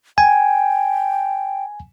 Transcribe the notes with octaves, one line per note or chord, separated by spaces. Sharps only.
G5 G#5